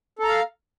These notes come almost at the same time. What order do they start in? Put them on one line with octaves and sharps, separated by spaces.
A4 A#5 F5